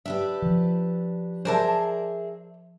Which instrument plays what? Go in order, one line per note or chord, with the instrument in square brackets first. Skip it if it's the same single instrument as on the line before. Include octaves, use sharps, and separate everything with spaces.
[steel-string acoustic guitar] D4 G4 B4 [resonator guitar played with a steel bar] E5
[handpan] F3
[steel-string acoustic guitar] G#4 A#4 E5 [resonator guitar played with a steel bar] C5 D5 A5